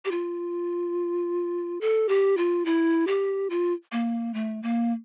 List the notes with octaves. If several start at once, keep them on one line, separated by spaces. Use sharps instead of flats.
G4
F4
A4
G4
F4
E4
G4
F4
A#3
A3
A#3